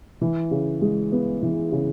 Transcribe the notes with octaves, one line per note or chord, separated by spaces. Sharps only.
E3
C#3
G#3
B3
E3
C#3